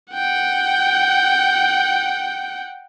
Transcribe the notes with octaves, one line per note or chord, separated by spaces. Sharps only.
F#5 G5